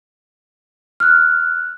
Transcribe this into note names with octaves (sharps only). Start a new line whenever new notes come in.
F6 F#6